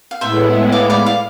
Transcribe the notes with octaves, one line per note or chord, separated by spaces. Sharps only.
F5
A2 G#3 B3 E4 C5 E5
D5 F5
D5 F5
D5 F5